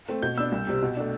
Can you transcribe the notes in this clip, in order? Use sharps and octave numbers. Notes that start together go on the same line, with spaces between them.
A3 C4
B2 G6
B3 D4 E6
C2
C3 G3 C4
B2
A3 D4